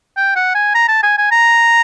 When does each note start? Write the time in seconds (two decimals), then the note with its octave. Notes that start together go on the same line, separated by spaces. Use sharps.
0.17 G5
0.36 F#5
0.55 G#5
0.75 A#5
0.88 A5
1.03 G#5
1.18 G#5
1.31 A#5